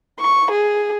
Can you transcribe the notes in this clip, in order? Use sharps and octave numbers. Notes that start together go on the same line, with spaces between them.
C#6
G#4